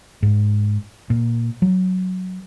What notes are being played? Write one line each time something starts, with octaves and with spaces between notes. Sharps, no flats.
G#2
A#2
F#3